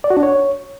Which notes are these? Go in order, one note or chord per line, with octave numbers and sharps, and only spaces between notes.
D5
F#4
D4
C#5